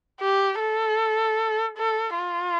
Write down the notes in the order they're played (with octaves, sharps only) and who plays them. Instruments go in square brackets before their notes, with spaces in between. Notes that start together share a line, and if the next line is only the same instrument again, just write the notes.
[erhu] G4
A4
A4
F4